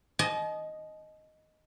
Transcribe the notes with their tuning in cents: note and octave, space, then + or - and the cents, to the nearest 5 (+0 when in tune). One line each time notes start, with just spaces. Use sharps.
D#5 +0 A5 -45